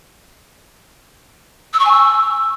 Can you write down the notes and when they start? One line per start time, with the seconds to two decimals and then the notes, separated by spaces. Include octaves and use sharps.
1.73 E6
1.79 C#6
1.85 G#5
1.91 E6